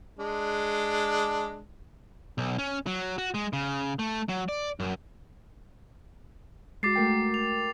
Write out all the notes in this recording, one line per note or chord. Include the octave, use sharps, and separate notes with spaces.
G#3 D4
B1
C#4
F#3
F#4
G#3
C#3
A3
F#3
D5
F#2
G#3 F#4 D6 A6 C7
A3 A#4 G5
F7